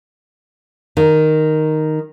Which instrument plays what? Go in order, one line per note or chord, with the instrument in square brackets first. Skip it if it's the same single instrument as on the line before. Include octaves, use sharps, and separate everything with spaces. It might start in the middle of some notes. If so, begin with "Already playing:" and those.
[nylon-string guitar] D#3